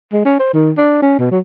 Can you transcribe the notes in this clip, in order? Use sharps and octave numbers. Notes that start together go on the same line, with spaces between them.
G#3
C#4
C5
D#3
D4
C#4
B2
F#3